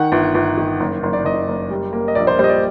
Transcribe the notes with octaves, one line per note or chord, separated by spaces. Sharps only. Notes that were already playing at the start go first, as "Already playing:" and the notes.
Already playing: D#3 F#5
G1
G1
D#3
F#1
F#1
D5
F#1 D#5
F#1
G3
A#3
D#5
A#1 D5
C5
G3 C5
D#5
D5